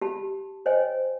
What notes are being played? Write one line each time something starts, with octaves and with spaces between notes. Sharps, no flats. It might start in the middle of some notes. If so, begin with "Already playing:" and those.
G4 A5 B5
C5 C#5 D#5 G5 G#5